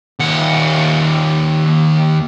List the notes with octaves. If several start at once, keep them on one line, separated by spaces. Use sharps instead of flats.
D#2 F#5